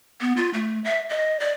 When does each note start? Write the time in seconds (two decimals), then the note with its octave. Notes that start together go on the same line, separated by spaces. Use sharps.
0.21 B3
0.37 F4
0.54 A3
0.84 E5
1.10 D#5
1.40 D5